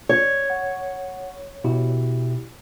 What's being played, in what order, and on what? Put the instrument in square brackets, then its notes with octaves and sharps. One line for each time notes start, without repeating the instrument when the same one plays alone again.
[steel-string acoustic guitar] C#5
[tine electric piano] F#5
B2 E4 G4